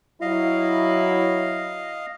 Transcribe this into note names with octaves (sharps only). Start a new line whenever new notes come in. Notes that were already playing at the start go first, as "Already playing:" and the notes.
F#3 E4 D#5 F5